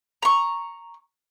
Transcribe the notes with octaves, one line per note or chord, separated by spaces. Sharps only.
A#5 C#6